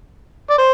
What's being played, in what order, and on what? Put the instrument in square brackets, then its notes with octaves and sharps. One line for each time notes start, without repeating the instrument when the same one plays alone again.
[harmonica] D5
C5